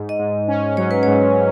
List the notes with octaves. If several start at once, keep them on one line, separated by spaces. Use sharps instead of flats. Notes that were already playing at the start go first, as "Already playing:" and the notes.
Already playing: G#2
D#5
G#2
C#4
F#3 C#5
B4
G#2 C#5